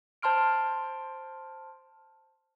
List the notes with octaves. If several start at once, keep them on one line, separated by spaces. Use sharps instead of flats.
C5 A5 C6 F6 D7